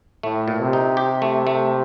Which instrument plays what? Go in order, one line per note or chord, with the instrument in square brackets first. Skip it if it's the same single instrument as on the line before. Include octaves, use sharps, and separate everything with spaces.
[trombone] A2 [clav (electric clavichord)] A3
[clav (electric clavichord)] A#2
[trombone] C3
[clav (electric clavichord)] D#4
G4
A3
A3